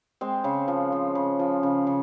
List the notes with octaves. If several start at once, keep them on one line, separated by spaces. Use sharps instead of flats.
G#3 C4
C#3
F3
F3
C#3
F3
C#3
C#3